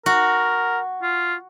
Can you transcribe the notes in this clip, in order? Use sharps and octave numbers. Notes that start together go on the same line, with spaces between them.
F#4 A#4
F4